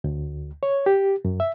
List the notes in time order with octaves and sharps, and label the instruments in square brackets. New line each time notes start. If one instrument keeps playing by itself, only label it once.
[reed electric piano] D2
C#5
G4
F#2
E5